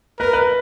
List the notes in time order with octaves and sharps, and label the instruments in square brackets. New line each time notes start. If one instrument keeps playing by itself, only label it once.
[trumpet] A#4 [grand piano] B4
[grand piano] B4